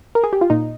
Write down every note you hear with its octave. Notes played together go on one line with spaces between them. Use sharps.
A#4
G#4
G4
F4
A#2 D#4